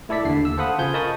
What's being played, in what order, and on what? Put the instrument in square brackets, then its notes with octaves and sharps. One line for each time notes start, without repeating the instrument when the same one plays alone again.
[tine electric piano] A3 E4 A4 D5 B6
D#2 D3 C7
E6
A4 C5 F5 F#5 B5 D#6
C#3 F4 C5 G#5 G6
A#4 D#5 A5 B5 C#6 D#6